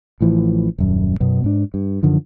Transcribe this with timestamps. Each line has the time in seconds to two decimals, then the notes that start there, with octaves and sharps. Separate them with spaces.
0.21 A1 A2 E3 F3
0.78 D#1 F#2
1.20 F#2 B2 B3
1.44 G#2 D4
1.74 G2
2.03 F#2 D3 D#3 F3